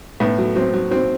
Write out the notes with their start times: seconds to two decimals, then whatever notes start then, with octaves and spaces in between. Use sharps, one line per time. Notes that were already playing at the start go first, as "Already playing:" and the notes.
0.20 A2 B3
0.38 F#3
0.56 F#3 C4
0.73 F#3
0.91 F#3 C4